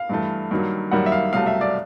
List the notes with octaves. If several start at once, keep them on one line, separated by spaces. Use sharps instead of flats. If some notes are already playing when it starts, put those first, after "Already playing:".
Already playing: F5
G2 E3 A3
G2 D#3 F#3 A#3
F#2 D#3 G3 A#3 F#5
E5
F5
C2 B2 F#3 A3 F5
E5
D5